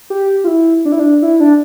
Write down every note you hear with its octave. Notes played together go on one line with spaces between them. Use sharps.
G4
F4
E4
D4
E4
D4
E4
D4